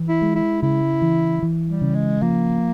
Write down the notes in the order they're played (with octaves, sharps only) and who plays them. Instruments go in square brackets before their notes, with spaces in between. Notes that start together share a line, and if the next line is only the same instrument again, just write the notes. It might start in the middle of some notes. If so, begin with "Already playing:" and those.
Already playing: [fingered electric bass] E3
[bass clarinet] E4
[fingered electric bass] G#3
[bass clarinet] E4
[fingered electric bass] C#3 [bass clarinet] E4
[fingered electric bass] E3
E3
[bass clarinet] G3
[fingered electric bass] C#3
[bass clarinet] G#3
[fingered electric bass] F3 [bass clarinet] A#3